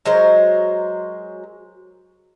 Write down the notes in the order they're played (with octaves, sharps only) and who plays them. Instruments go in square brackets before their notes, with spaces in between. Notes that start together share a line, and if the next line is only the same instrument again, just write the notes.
[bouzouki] F#3 G#3 A#4 C5